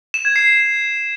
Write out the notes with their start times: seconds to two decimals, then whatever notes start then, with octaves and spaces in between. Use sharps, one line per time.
0.14 E7
0.25 G#6
0.36 C7